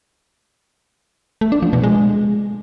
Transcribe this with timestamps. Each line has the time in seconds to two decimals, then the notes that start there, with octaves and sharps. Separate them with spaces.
1.41 A3
1.52 D4
1.62 F3
1.73 B2
1.83 G#3